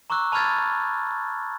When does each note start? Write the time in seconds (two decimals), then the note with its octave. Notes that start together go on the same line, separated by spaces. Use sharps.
0.10 A#5 C#6 D6 E6 F#6
0.32 A5 B5 C#6 F6 G#6 A6